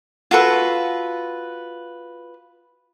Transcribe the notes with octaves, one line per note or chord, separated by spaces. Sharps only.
F4 F#4 A4 B4